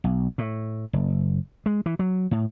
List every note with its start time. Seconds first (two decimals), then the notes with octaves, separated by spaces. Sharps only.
0.04 B1
0.38 A2
0.93 F#1
1.66 G#3
1.86 E3
1.99 F#3
2.31 A2